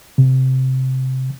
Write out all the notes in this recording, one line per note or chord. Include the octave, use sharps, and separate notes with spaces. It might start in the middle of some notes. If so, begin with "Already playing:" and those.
C3